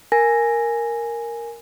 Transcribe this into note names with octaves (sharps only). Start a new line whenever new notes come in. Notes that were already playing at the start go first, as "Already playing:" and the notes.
A#4 G#5 A#6